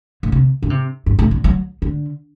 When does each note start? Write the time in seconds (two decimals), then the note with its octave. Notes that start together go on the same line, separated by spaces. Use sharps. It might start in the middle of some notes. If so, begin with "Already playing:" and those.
0.23 A#2
0.32 C3
0.62 D3
0.70 C3
1.06 G2
1.19 A2
1.31 A#2
1.44 F#3
1.82 D3